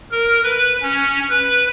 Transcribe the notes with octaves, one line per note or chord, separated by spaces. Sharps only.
A#4
B4
C#4
B4